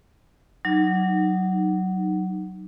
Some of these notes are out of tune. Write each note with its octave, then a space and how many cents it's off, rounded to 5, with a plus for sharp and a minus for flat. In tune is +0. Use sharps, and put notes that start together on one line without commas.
F#3 +15 D#4 -10